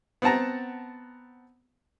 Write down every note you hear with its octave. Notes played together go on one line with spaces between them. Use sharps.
B3 C4 F#5 A5 A#5